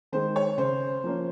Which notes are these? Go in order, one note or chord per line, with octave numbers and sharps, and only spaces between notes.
D#3 G#3 C5
C#5
C#3 C5
F3 A#3 C#4